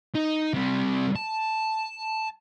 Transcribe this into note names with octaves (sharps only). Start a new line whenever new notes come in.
D#4
C3 G3
A5